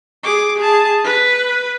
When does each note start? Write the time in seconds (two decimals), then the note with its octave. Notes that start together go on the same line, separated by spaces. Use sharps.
0.23 G#4 D6
0.58 G#4 A5
1.04 B4